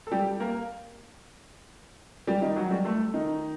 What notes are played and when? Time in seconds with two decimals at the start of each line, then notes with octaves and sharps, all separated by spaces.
0.07 A4
0.12 G3 G4
0.40 A#3 A#4
2.27 G3 G4
2.42 D#3 D#4
2.56 F#3 F#4
2.71 G3 G4
2.85 A3 A4
3.14 D#3 D#4